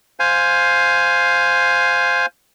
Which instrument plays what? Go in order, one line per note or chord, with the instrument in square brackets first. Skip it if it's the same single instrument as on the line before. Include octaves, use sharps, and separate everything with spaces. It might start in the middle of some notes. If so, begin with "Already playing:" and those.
[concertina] C5 F5 G#5